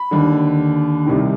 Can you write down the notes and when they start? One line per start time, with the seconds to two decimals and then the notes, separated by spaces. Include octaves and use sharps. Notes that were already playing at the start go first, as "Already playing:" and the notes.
Already playing: B5
0.11 D#2 D3
1.06 C2 C3 D#3